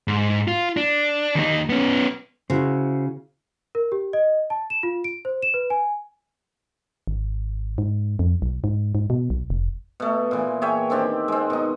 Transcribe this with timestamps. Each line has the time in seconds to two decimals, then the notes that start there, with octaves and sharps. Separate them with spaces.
0.08 G#2
0.48 F4
0.77 D4
1.35 D#2 D#4
1.70 B3 C#4
2.50 C#3 E4 F#4 C5
3.75 A#4
3.92 G4
4.13 D#5
4.50 A5
4.70 E7
4.83 F4
5.04 D7
5.25 C5
5.43 E7
5.54 B4
5.70 G#5
7.07 G#1
7.78 G#2
8.19 F2
8.42 B1
8.64 G#2
8.95 G#2
9.10 B2
9.30 B1
9.50 F1
10.00 B2 A3
10.31 A#2 E3
10.62 G#4 C#5 E5 G5
10.90 D#3 C4 D4 G4
11.28 G#3 C4
11.50 B2 D#4